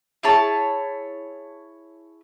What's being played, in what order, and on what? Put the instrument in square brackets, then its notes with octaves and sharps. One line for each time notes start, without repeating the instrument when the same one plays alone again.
[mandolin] E4 G#4 C#5 A5